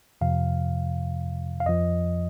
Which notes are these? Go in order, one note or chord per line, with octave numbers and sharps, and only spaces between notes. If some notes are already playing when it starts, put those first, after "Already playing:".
F2 C3 F3 F5
F5
F2 F3 D#5